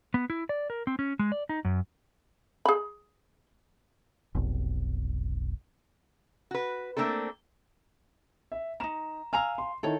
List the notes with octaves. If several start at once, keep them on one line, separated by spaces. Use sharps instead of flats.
B3
E4
D5
A#4
C4
C#4
G#3
D5
D#4
F#2
G#4 B5
F1 B1
F#4 B4
A3 A#3 C4 D4 A4
E5
C#4 D#4 A#5 E7
F5 G#5 A#5 E6 F6
C6
D#3 E4 A4 C#5